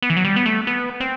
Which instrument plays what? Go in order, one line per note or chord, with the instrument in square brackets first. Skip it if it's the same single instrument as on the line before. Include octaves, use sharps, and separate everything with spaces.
[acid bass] B3
E3
F#3
G3
B3
A3
B3
C4